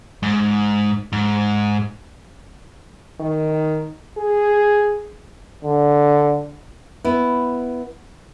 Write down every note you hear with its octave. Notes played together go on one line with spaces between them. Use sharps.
G#2
G#2
D#3
G#4
D3
B3 E4